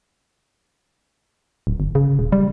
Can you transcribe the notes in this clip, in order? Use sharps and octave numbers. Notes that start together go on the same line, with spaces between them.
D1
G1
C#3
D#1
G3